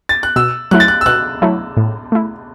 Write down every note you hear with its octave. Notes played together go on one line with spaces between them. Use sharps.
A6
F#6
B2 E6
F#3 A3 E4 F#6
A6
F#6
E6
B2 F#6
F#3 A3 E4
A2
A3 E4